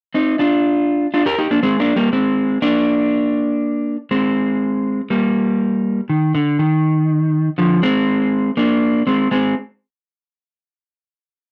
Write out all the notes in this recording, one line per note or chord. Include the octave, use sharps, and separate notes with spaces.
C4 D#4
D4 F4
D4 F4
G4 A#4
D#4 G4
A#3 D4
G#3 C4
A#3 D4
G3 A#3
G#3 C4
A#3 D4
G#3 C4
G3 A#3
D#3
D3
D#3
D3 F3
G#3 C4
A#3 D4
G#3 C4
G#3 C4